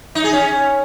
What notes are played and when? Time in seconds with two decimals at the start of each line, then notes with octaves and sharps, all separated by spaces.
0.15 D#4
0.24 G#4
0.33 C#4